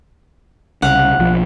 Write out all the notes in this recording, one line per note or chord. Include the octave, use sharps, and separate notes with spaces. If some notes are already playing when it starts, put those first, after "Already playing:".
C2 C#3 F5 F#5
B1 F3